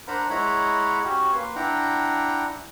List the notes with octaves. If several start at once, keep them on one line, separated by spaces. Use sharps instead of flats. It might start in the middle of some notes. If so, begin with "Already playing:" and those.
D4 A#4 C5 F#5 A#5 B5
G#3 E4 C#5 F#5 A#5 B5
C#4 F#4 G4 C#5
A#3 B4 C6
D4 E4 F#5 G5 A#5